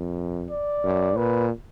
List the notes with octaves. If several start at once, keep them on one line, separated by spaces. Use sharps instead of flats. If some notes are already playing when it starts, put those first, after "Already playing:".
Already playing: F2
D5
F#2
A#2 B4